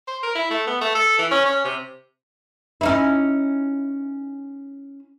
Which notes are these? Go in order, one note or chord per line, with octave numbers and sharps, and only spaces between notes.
C5
A#4
E4
A3
B3
A3
A4
E3
C#4
C#4
C3
C#4 D#4 E4